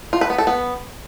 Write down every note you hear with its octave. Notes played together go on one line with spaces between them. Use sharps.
F4
B4
B3
A4
B3